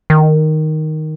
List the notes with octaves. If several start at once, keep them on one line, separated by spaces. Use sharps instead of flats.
D#3